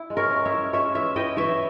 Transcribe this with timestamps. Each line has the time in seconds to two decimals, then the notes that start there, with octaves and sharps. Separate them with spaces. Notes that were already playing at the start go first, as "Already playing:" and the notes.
Already playing: E4
0.10 G#3
0.17 A#4 C#5
0.31 C#4
0.45 C#5 E5
0.52 E4
0.73 G#3 C#5 E5
0.94 E3 C#5 E5
1.16 E4 D#5 G5
1.36 E3 C#5 E5